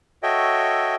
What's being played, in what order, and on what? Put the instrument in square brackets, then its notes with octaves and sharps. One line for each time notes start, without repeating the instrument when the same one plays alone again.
[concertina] F#4 A4 C#5 D#5 E5 G5